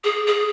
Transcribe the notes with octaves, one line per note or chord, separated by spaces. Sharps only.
G#4
G#4